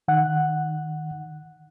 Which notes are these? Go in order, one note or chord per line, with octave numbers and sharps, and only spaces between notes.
D#3 F#5 F#6